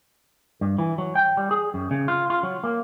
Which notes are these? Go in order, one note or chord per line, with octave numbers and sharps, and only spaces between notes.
G2
E3
F#3
G5
G3
G#4
F#2
C#3
F4
F4
F#3
A#3